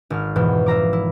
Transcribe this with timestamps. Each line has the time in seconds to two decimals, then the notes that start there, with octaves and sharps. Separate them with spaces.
0.10 G#1 F6
0.36 F2 G#2 B2 E3
0.66 E5 F5 A#5 D6
0.93 E4